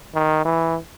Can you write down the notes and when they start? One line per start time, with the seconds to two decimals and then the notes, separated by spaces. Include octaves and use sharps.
0.14 D#3
0.45 E3